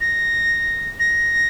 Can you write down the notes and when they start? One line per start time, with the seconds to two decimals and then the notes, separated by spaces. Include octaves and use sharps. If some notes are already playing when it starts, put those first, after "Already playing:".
0.01 A#6
1.00 A#6